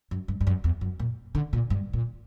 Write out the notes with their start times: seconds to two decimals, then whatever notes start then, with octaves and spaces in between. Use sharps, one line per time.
0.11 F#2
0.28 G2
0.41 G2
0.47 F#2
0.64 E2
0.81 F#2
1.00 A#2
1.35 D3
1.53 A#2
1.70 G2
1.93 A#2